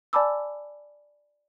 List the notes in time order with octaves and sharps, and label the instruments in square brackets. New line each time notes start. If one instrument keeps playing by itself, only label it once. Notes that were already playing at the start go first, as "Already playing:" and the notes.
[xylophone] D5 G#5 A5 B5 D6 E6